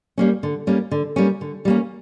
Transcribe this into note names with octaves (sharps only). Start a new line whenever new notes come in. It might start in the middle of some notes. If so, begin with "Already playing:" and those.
G3 A#3 C#4
D3
G3 A#3 C#4
D3
G3 A#3 C#4
D3
G3 A#3 C#4